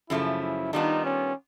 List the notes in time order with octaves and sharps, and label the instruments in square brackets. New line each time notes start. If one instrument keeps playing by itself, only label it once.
[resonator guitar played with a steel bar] F#2 C#3 F3 A3 [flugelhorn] E4
[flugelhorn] E4
[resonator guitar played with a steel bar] D#3 G3 B3 D4 F4 [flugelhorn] D#4
[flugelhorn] C#4